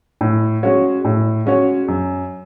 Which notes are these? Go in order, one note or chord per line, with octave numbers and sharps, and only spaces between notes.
A2
G#3 C#4 F#4 C#5
A2
G#3 C#4 F#4 C#5
F#2